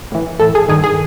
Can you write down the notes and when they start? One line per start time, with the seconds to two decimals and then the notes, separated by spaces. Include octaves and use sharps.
0.12 A2 E3
0.40 A2 E3 A4
0.55 G#4
0.69 G2 D#3 G#4
0.84 G#4